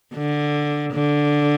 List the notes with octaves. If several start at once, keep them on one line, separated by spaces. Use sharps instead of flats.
D3
D3